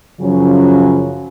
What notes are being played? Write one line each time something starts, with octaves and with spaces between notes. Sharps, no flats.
F#2 C#3 F3 F#3 C#4